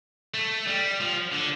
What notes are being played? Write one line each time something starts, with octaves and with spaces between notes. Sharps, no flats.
A3
G3
F3
D3